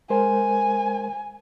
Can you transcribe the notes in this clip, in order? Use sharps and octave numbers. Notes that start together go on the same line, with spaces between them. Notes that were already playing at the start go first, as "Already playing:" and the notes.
G#3 A#4 C5 G#5